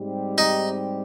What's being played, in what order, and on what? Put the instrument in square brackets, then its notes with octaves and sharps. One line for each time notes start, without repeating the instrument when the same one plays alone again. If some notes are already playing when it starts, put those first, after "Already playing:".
Already playing: [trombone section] G#2 G3 C4 G4
[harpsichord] D#4